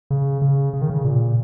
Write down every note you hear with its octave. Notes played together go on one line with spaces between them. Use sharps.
C#3
C#3
C#3
D#3
C#3
A#2